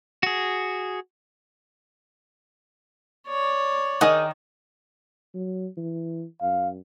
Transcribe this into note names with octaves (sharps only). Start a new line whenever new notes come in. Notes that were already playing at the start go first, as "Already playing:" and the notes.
F#4 G#4
C#5 D5
D#3 G#4 D#5 F#5
F#3
E3
F#2 F5